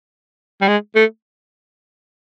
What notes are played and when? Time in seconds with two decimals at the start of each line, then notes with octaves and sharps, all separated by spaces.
0.62 G3
0.68 G#3
0.96 A3